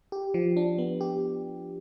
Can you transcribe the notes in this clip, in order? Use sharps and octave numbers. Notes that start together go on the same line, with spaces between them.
G4
F3
D4
B3
G4